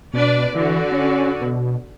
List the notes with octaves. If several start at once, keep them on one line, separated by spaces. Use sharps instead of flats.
B2 D4 B4 D5
D3 E3 F#4
C#4
B2